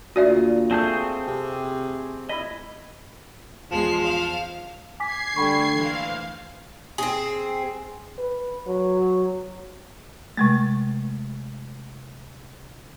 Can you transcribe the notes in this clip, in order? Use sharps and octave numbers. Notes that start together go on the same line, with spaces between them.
D2 A#2 F#4 D5 E5
A3 C4 G#4 G6
C3
E4 D#5 B5
E2 F3 G#3 C7
F5
G#5 D6 G#6 B6 C7
D3 G3 A3 G5 B5 C#6
E3 A#3 C5 F5
C4 G#4
B4
F#3
C3 G#3 A3